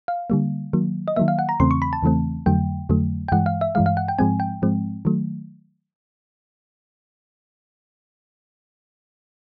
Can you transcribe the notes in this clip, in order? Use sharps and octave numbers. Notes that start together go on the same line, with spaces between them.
F5
D3 G3 A#3
D#3 F#3 A#3
D#5
D#3 F#3 A#3 E5
F5
F#5
A#5
E2 C#3 E3 A3 C4 C6
C#6
B5
A5
E2 C#3 E3 A3 C4
F2 D3 F#3 A3 G5
F2 D3 F#3 A3
G5
G2 E3 G#3 F#5
F5
E5
G2 E3 G#3 F5
F5
F#5
G5
G#2 F3 G#3 C4 G#5
G5
G#2 F3 G#3 C4
D#3 F#3 A3